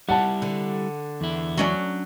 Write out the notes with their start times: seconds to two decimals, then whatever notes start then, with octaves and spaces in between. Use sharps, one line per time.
0.09 G3 E4 F#5 A5
0.42 D3
1.21 E2 E4
1.57 F#3 C#4 D4